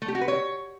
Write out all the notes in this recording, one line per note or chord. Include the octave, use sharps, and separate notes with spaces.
A3
G4
F#4
B4
C#5